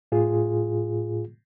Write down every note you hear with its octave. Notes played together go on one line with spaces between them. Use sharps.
A2 F4 G#4